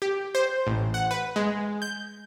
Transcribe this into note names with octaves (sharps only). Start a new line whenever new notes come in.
G4
C5
A1
F#5
B4
G#3
G6